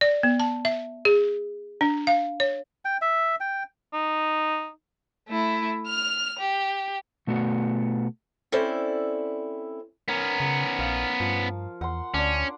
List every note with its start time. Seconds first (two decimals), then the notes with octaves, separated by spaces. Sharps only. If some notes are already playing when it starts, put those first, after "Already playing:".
0.01 D5
0.23 B3
0.40 A5
0.65 E5
1.05 G#4
1.81 D4
2.07 F5
2.40 C#5
2.85 G5
3.02 E5
3.40 G5
3.93 D#4
5.29 A3 E4
5.87 F6 F7
6.39 G4
7.27 B2 A3 B3 F#4
8.52 C4 C#4 E4 A4 C5 D5
10.08 B3 C#4 A#4 A#5
10.40 C#3
10.79 A#1 F5
11.20 G2 F3
11.81 E2 F#5 C6
12.14 D2 C#4 D4 D5